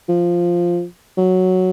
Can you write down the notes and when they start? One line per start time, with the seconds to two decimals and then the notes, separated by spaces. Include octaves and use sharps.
0.09 F3
1.17 F#3